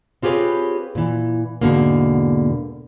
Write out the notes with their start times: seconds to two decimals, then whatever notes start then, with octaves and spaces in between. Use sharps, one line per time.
0.22 C4 F4 G4 G#4 B4 C#5
0.95 A#2 E3
1.61 E2 G#2 B2 D3 A#3